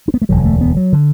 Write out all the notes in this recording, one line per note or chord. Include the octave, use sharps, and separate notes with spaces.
D4
B3
A3
E1 D2 D3 F#3
A3
B3
F#3
D3